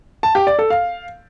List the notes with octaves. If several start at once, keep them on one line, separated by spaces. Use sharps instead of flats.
A5
G4
D5
A4
F5